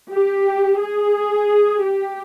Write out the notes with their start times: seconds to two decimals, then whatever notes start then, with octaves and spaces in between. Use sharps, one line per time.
0.11 G4
0.80 G#4
1.82 G4